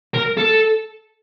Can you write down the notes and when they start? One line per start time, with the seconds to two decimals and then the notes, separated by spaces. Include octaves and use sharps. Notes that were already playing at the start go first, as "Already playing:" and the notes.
0.14 A#4
0.38 A4